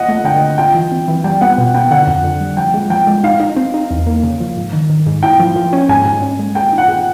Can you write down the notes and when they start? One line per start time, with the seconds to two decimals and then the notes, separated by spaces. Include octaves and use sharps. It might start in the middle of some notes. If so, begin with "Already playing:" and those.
Already playing: D#5 F#5
0.09 A3
0.24 D3 G5
0.41 D3
0.58 F4 G5
0.75 E3
0.92 C4
1.08 E3
1.24 G3 G5
1.41 B3 F#5
1.58 B2
1.74 B3 G5
1.91 D3 F#5
2.07 F2
2.24 D3
2.41 G3
2.57 F3 G5
2.74 G#3
2.90 F3 G5
3.07 G#3
3.24 D#4 F5
3.40 D#4
3.56 C4
3.74 D#4
3.91 E2
4.07 A#3
4.23 C#3
4.40 F3
4.57 G#2
4.73 D#3
4.90 D#3
5.06 G#2
5.23 E4 G5
5.39 F3
5.56 F3
5.73 C#4
5.89 G#2 G#5
6.05 G#2
6.22 C#4
6.39 G#3
6.55 G#4 G5
6.72 D#4
6.78 F#5
6.88 G#4